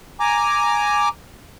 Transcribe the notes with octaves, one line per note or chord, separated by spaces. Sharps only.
G#5 A#5 D6